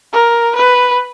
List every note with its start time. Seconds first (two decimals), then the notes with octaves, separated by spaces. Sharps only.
0.13 A#4
0.56 B4